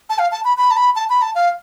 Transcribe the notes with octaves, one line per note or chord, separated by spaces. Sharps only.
A5
F5
A5
B5
B5
A5
B5
A5
B5
A5
F5